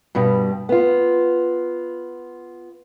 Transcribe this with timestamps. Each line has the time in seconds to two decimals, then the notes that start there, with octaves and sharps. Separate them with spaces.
0.15 G2 B2 G3
0.69 B3 F4